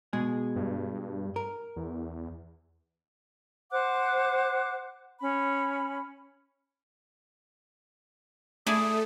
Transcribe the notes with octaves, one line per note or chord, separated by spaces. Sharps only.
B2 G#3 G#4
G2
A#4
E2
C5 F#5 D6 F#6
C#4 B5
A3 E4 G#4 D5 D#6